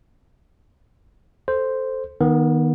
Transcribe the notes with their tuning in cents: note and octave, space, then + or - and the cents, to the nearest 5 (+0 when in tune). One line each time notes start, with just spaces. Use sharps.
A4 +0 C5 +0
D#3 +0 B3 -25